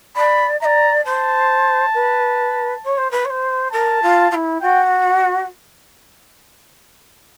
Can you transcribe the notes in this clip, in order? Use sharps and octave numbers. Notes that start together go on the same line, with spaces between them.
D5 B5
D5 E5 A#5
C5 A5
B4
C#5
C5
B4
C#5
C5
A#4 A5
F4
F4
E4
F#4 G5